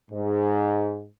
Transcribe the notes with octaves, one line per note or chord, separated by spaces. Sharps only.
G#2